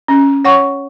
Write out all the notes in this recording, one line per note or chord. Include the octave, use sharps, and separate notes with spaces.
C#4
C#5 F#5 C#6